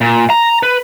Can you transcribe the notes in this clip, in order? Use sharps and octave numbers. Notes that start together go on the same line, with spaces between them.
A#2
A#5
B4